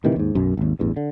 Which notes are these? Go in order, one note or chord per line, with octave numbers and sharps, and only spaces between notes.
A2 C3 D#3 E3
D#2 G#2
B1 F#2
G#1 D#2
A1 E2 G2
D3